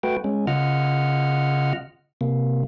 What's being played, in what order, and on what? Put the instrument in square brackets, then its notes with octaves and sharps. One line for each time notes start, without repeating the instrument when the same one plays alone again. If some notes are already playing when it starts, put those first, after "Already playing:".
[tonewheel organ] A3 F#4 B4 G5
G#3 C#4
C#3 F4 D#5 F#5 F6
C3 A#3